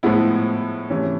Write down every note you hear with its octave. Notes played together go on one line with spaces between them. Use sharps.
A2 F3 G#3 B3 E4
C3 E3 A3 C#4